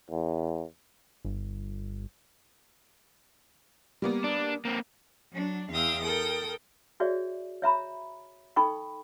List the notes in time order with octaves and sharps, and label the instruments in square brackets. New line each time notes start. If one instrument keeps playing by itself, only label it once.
[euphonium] E2
[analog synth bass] G1
[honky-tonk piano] G3 A#3 B3
[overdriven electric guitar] D4
A#3 C4
[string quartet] F#3 D4
E2 F5 G5 D#6 E6
A4 A#4 G5 D#6
[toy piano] F#4 G#4 C#5 D5 E5
C#5 E5 A#5 B5
D#4 A4 G5 B5 C#6